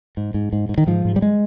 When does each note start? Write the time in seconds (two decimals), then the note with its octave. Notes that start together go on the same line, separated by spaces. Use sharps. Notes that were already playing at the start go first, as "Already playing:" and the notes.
0.17 G#2
0.34 G#2
0.53 G#2
0.69 G#2
0.78 D#3
0.87 G#2 F3
1.05 G#2
1.16 G3
1.22 G#3